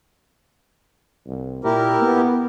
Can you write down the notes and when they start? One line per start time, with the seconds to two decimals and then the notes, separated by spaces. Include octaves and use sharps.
1.27 C2
1.64 A#2 E4 G4 A#4
2.02 B3